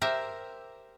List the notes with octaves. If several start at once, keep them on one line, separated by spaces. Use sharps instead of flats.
G4 A#4 C5 E5